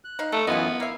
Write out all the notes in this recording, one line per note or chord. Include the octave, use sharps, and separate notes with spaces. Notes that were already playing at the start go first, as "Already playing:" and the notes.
F#6
D#4 F5
A3 A5
F#2 E3 G#3 B3 E4 F4 D#5
A#3 E4 E5 F5